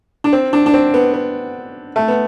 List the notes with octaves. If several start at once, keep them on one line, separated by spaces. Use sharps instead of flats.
D4
C4
D4
D4
C4
B3
B3
A3
B3